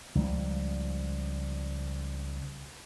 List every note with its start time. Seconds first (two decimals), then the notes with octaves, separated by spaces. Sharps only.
0.15 C#2 F3 G3